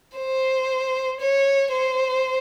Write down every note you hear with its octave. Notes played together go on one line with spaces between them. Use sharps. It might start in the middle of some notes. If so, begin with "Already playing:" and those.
C5
C#5
C5